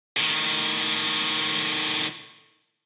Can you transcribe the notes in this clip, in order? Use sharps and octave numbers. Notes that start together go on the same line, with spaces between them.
A2 D#3